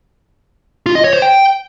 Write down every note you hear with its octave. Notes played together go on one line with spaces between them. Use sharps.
F4
D#5
C#5
C5
G5